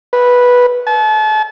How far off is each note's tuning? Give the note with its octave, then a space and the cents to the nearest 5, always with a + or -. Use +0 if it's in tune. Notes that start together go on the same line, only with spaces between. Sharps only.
B4 -10
A5 -35